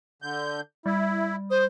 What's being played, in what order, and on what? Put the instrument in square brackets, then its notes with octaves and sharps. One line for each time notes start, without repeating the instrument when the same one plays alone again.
[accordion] D3 G6
[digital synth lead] G3 [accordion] E4
[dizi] C5 [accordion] D#6